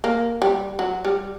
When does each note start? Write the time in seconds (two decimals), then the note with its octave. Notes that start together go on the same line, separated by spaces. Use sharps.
0.04 A#3
0.42 G3
0.79 F#3
1.05 G3